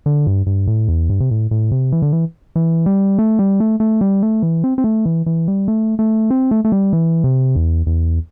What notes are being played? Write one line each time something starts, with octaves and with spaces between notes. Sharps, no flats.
D3
G2
G2
A2
E2
G2
C3
A2
A2
C3
E3
D3
E3
E3
G3
A3
G3
A3
A3
G3
A3
E3
C4
C4
A3
E3
E3
G3
A3
A3
C4
A3
A3
G3
E3
C3
E2
E2